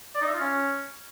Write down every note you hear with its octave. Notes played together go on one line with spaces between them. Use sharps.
D5
D#4
E5
F4
C#4